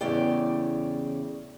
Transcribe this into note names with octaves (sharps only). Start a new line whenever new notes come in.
E2 A2 C#3 G4 D5 G5